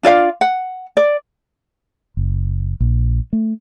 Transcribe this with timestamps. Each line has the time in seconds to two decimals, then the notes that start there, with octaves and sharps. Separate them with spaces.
0.03 D4 F4 D5 F5
0.41 F#5
0.97 D5
2.17 F#1
2.80 A#1
3.33 A3